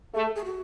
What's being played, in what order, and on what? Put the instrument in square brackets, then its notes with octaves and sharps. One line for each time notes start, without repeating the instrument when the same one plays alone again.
[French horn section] A3 [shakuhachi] G#4
[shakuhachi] A4
G#4
F#4